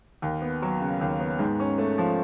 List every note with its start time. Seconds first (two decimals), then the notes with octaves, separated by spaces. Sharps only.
0.22 D#2
0.42 B3
0.62 F#3
0.81 C#3
1.01 D#2
1.21 B3
1.39 G#2
1.60 C#4
1.78 A3
1.98 F3